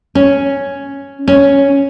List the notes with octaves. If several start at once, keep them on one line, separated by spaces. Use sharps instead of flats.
C#4
C#4